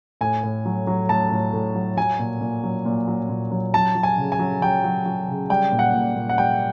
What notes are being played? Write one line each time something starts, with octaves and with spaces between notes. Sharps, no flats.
A2 G#5
A2
F#3
F#3
A2 A5
A2
A2
F#3
F#3 G#5
A#2
A#2
F#3
A#2
F#3
A#2
F#3
F#3 A5
F#3
G#5
C#3
G#5
F#3
F#3 G5
F#3
F#3
C#3
G3 G5
A#2
F#5
A#2
A#2
F#5
G3 G5